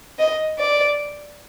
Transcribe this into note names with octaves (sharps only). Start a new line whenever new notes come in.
D#5
D5